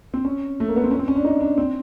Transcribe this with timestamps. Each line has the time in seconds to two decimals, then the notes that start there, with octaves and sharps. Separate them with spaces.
0.14 C4
0.25 C#4
0.60 A3
0.68 A#3
0.76 B3
0.84 C4
0.91 C#4
0.99 C4
1.08 C#4
1.16 D4
1.24 D#4
1.41 D4
1.58 C4